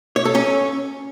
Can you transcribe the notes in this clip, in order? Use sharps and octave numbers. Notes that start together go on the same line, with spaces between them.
C#5
A4
C#4